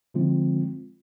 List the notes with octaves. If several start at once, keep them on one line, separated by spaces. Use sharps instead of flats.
D3 F3 G#3 C4 F4